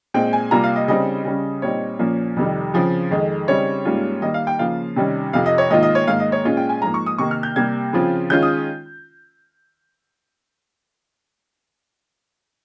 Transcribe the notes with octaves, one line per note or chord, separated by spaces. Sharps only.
A#2 G#3 C4 G5
G#5
C3 G3 A#3 F4 A#5
F5
D#5
C#3 G3 C4 D#4 D#5
C#3 G3 C#4
A#2 G3 C4 D#4 C#5
A#2 F3 A#3 C#4
F2 C3 D#3 G3
C#3 F3 C4
F2 D#3 G#3
C#3 G3 C4 D#4 C#5
G#2 G3 A#3 C#4 F4
D#3 G3 A#3 D#5
F5
G5
C#3 F3 A#3 F4 F5
C3 D#3 G3 C#4
F2 C3 F3 F5
D#5
C#5
G#2 D#3 A#3 F4 D#5
D#5
C#5
G#2 D#3 A#3 F5
D#5
C#5
A#2 G#3 C#4 F4
G5
G#5
G#2 F3 A#3 A#5
C#6
D#6
C3 D#3 A#3 C#6
F6
G6
C3 G3 A#3 G#6
C#3 F3 C4 F4
D#3 G#3 C#4 F4 G6
D#6